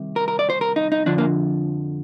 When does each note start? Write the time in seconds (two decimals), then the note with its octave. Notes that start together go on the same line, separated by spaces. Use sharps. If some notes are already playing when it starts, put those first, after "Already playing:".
Already playing: C2 C3 D#3
0.16 A#4
0.28 A#4
0.39 D5
0.50 C5
0.61 A#4
0.76 D#4
0.92 D#4
1.06 F2 D3 F3 D4
1.18 A#3